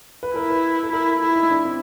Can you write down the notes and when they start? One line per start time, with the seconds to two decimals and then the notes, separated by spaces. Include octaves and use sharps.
0.23 B4
0.35 E4 A#4
0.50 B4
0.83 A4
0.93 E4 A#4
1.22 E4 A4
1.36 D#4
1.51 D4
1.65 C4